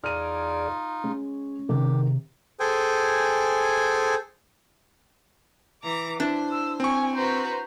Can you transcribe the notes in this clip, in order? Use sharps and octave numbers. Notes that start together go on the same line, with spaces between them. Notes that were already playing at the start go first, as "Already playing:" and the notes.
E2 D#4 F4 G#4 D5 F6 D#7
G#3 C#4
C3 D#3 G4
G#4 A4 C5 G5 G#5
E3 A#5 D6
D4 E4 C5
E6
C4 G#5 C#6
F#4 B4 C5 A#5